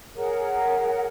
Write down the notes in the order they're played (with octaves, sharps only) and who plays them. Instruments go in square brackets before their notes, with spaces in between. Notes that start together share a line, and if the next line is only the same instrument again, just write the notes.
[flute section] G#4 A#4 C#5 F#5